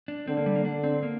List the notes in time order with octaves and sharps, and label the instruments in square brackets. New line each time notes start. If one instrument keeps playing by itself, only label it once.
[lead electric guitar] D4
[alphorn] D3 [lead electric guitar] C4
[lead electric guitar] A#3
G3
A#3
[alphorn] D3 [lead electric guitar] D4
[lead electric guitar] C4
A#3